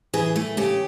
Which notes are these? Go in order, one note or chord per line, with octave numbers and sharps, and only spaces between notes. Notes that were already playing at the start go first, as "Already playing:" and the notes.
E3 G#4
A3
C#3 G4